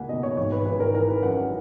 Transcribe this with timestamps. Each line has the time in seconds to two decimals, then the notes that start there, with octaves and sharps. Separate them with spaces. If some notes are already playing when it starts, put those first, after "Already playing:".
Already playing: C#2 A#3 F#5 G#5 B5
0.09 B2 D#5
0.23 C#5
0.37 G#1 C#5
0.52 B4
0.66 G#1 B4
0.80 A#4
0.94 E3 A#4
1.08 B4
1.23 F#2 F#5
1.37 F#5